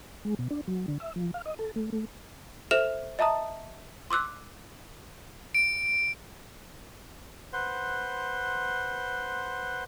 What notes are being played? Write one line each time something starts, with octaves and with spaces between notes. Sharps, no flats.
G#3
B2
D4
F#3
D3
E5
F3
F5
D#5
A4
A3
A3
A4 C5 E5 F6 E7 F7
D#5 E5 A5 A#5 D#6
C6 D6 E6 F#6
D7
B4 C5 F#5 C6